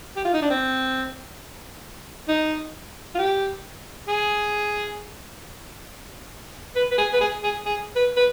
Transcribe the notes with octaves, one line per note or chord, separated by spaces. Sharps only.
G4
F4
D#4
D4
C4
D#4
F4
G4
G#4
B4
B4
G#4
B4
G#4
G#4
G#4
B4
B4